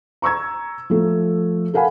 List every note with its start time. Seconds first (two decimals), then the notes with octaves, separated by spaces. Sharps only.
0.22 A#5 C#6 E6 G#6
0.90 F3 A3
1.74 A4 A#4 F5 F#5 G#5 B5